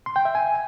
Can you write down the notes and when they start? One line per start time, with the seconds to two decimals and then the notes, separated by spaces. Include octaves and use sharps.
0.06 C6
0.16 G5
0.25 E5
0.35 G#5